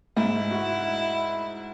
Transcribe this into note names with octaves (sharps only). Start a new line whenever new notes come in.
G#2 E4
F#4